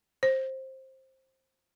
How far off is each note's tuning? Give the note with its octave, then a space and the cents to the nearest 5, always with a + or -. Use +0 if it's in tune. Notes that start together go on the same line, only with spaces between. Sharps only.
C5 +15